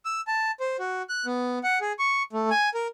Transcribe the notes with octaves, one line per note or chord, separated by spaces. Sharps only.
E6
A5
C5
F#4
F#6
B3
F#5
G#4
C#6
A3
G#5
A#4